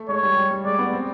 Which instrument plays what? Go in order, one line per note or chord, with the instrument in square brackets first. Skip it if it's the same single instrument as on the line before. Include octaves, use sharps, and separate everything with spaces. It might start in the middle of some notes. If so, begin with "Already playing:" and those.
Already playing: [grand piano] A3
[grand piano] G#3 [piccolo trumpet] C#5
[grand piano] G3
G3
G3
[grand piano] G#3 [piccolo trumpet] D5
[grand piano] B3
C4